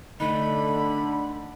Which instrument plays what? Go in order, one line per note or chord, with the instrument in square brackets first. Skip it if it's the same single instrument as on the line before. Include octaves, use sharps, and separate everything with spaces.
[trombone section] D3 [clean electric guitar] A3 D#4 [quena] B5